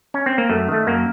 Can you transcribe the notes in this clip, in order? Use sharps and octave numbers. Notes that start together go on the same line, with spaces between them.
C#4
C4
A#3
F#2 A3
D#3 A3
F#2 A#3